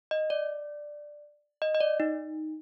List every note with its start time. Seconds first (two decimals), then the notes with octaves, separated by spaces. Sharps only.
0.11 D#5
0.30 D5
1.62 D#5
1.75 D#5
1.80 D5
2.00 D#4